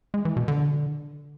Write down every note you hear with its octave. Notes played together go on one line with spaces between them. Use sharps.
G#3
E3
B2
D3